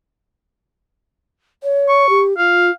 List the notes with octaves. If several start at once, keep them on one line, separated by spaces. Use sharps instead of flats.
C#5
C#6
G4
F4 F5